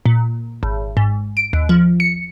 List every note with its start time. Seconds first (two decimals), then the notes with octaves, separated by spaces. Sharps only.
0.06 A#2
0.63 G#1
0.97 G#2
1.37 D7
1.53 D#2
1.69 F3
2.00 C#7